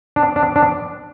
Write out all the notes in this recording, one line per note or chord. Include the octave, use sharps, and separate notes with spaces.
D4
D4
D4